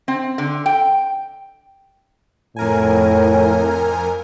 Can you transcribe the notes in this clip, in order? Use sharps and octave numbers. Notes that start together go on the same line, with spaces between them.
C4
D3
G5
F2 A2 A#4 G#5